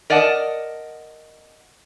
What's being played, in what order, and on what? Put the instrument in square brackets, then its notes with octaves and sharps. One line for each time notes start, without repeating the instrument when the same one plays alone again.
[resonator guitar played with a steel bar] A#4 D5 D#5 F#5 A5